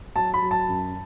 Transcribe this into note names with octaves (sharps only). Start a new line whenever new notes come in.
F#3 A5
B5
F#3
A5
F#2